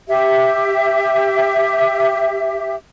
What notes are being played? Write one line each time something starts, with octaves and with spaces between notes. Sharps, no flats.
G4 E5